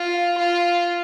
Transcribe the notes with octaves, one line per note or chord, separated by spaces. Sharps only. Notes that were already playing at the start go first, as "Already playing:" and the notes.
Already playing: F4
F4